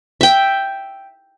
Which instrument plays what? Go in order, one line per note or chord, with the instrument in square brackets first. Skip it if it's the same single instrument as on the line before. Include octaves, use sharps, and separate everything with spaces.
[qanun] E5 G5